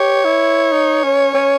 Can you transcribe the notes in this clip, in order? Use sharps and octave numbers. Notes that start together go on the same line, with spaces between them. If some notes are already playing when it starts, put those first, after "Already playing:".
Already playing: G4 C#5
E4
D#4
C#4
C#4